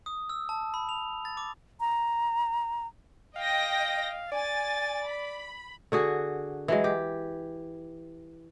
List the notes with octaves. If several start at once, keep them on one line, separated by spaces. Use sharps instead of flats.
D#6
E6
A5
B5
F7
A6
D6
A#5
D#5 F5 G5 A#6
D5 G#5 A6
B5
D3 F#4 G#4
E3 F#3 G#3
G4